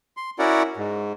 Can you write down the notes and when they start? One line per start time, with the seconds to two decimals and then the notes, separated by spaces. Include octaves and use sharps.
0.17 C6
0.39 C#4 E4 F#4 A#4 D5 F#5
0.77 G#2